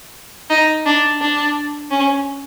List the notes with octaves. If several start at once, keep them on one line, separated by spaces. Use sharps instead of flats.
D#4
D4
D4
C#4